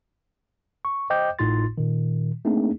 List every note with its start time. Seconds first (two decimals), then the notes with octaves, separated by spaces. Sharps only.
0.85 C#6
1.10 C5 D#5 G5 D6 G6
1.39 G#1 A2 D#4 F4 C6 A6
1.78 A#2 D#3
2.45 A3 A#3 C4 D4 D#4 G#4